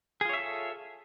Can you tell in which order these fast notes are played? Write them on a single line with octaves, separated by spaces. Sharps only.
G#4 F4 C#5 E5 A4